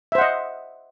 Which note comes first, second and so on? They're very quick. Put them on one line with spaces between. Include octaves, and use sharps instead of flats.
E5 C5 F#5 D#5